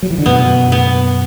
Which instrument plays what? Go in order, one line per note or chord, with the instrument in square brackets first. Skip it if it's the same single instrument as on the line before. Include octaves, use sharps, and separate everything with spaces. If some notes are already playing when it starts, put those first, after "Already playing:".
[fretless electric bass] F#3
E3
D3
[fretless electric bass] F#2 B2 [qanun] B3
[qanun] B3